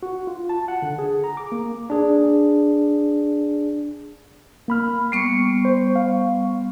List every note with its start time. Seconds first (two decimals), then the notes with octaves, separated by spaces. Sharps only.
0.03 F#4
0.27 F4
0.49 A5
0.68 F#5
0.82 D3
0.99 G#4
1.24 A#5
1.37 D6
1.52 A#3
1.90 D4 G#4
4.68 A#3 B5 F6
5.12 G3 B3 C#6 C7 C#7
5.65 C5
5.96 F5